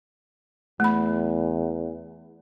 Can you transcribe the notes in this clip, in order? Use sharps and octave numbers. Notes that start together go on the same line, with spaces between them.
E2 A3 B5